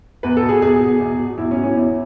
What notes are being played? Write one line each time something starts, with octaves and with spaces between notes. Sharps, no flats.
E2 B4
A4
B2
G#4
E2 G#4
B2
E2
B2
E2 E4
C#4
B2
C#4
E2 E4